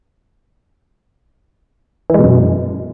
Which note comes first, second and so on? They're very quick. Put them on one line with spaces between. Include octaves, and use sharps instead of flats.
E3 G#3 B2 F#2